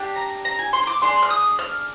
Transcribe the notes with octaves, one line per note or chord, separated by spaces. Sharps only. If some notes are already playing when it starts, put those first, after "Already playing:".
Already playing: D4 G4
A#5
A#5
G#5
C6
C6
D6
D4 G#4 C6
F6
D#6
F6